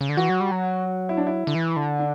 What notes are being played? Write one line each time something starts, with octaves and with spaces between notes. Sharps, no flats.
C#3
D3
E3 F#4
F#3
G3
F#3
E4
D4
E4
D3
E3
D3
D4